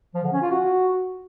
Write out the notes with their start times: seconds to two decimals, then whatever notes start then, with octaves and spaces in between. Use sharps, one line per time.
0.15 F3
0.24 D3
0.33 C#4
0.42 F4
0.50 F#4